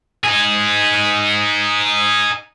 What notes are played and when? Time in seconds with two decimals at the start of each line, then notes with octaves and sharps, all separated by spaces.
0.24 D#4 G#4